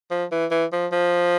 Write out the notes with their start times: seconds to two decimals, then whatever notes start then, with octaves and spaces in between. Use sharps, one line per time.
0.11 F3
0.31 E3
0.51 E3
0.72 F3
0.92 F3